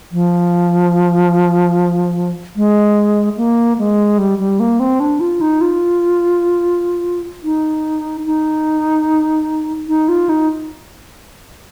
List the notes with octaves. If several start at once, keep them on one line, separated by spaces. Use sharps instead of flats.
F3
G#3
A#3
G#3
G3
G3
A#3
C4
D4
F4
D#4
F4
D#4
D#4
D#4
F4
D#4